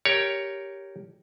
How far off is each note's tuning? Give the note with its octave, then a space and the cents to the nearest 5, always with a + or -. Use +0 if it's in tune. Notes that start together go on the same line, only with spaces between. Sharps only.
G4 +0 A#4 +0 C#5 +10